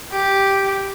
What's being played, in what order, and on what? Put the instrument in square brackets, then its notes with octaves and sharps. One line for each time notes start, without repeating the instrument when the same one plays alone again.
[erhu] G4